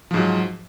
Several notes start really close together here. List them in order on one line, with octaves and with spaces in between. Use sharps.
F3 G#2 F#3